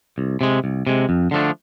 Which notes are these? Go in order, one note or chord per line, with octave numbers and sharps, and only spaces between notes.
C2
C3 G#3
C2
C3 G#3
F2
D3 F3 A3 D4